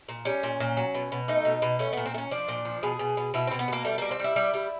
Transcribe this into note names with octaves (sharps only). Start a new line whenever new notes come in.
A#2
G3 C#4
A#2
A#2
F#3
B2
B2
A3 D#4
B2
B2
A3 C#4
A#2 B3
C4
A3
C#4
F3 D4
A#2
F3
B2 G#4
B2
B2
B2 E4
B2 C4
B3
B2 A#3
G3 A3
G3 A#3
C4
G3 E4
G3
G3